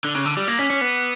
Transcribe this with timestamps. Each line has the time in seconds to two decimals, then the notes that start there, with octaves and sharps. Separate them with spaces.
0.04 D3 D6
0.15 C#3 F#6
0.26 D3 E6
0.37 G3 D6
0.48 A#3 D6
0.59 C#4 B6
0.70 C#4 C#7
0.81 B3 B6